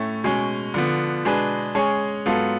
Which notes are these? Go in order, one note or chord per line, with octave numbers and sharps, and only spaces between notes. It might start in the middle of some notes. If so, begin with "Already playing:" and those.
Already playing: A2 A3 C#4
B2 G#3 C#4
D3 F3 B3
B2 G#3 D4 G#4 B4
G#3 C#4 G#4 C#5
G#2 F#3 B3 F4 A4